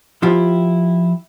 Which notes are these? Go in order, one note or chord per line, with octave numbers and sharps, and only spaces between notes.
F3 E4 F4 G4